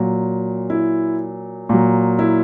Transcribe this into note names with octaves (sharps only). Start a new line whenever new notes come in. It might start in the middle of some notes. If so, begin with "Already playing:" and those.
Already playing: A#2 F#3
E4
A#2 F#3
E4